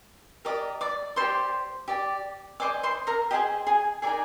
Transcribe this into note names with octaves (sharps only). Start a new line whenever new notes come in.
G4 A#4 D5 D#5 D6
D5 D6
G4 C5 D5 C6
G4 D5
G#4 C5 D5 D#5 D6
C5 C6
A#4 A#5
G4 G#4 C5 D#5 G5
G#4 G#5
D#4 G#4 A#4 D5 G#5